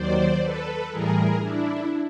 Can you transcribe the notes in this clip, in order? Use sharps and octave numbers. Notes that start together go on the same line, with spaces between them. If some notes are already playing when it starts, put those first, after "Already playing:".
Already playing: D#2 D#3 F#3 C5 D5
A4 B4
A2 E3 G3 G#4 A#4
D4 E4